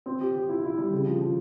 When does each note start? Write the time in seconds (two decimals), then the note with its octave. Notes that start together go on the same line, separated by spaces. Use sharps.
0.06 C4
0.21 G4
0.35 G4
0.49 E4
0.64 E4
0.78 G3
0.92 C#3
1.06 F3
1.21 F3